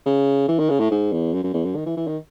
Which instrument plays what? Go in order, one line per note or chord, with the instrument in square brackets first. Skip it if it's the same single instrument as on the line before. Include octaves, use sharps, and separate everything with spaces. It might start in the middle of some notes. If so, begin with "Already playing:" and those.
[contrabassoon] C#3
E3
D#3
C#3
A2
G#2
E2
F#2
F#2
E2
F#2
D#3
E3
E3
D#3